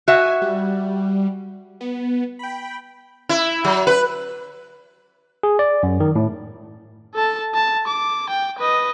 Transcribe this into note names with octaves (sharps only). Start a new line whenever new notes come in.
F#4 E5 G#5
G3
B3
G5 B5
E4
F#3
B4
G#4
D5
F#2
D#3
A2
A4 A5
A5
D6
G5
B4 D#5